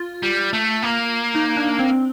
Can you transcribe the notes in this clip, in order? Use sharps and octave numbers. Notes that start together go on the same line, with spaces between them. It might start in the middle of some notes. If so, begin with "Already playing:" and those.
Already playing: F4
G3
A3
A#3
D#4
D4
C4